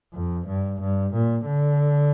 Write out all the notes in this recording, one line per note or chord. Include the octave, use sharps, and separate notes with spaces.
F2
G2
G2
A#2
D3